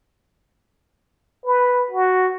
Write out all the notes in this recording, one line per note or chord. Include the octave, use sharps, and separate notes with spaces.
B4
F#4